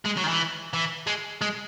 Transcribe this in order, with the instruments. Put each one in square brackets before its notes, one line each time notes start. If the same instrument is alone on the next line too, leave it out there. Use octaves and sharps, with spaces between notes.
[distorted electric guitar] G#3
F#3
D#3
E3
E3
G#3
G#3